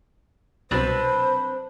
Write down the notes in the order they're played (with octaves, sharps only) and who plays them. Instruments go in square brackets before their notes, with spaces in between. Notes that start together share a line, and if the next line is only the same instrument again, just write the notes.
[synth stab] C2 B2 F#3 [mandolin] C4 D4 B4 [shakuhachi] C5